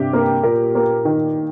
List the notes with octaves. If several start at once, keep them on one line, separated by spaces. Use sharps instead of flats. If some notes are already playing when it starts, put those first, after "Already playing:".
Already playing: G2 C3 G4
A#3
A#2 A#4
A#3
D#3